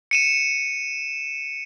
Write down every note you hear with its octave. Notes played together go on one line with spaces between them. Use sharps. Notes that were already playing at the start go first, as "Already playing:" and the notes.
C#7 D#7 E7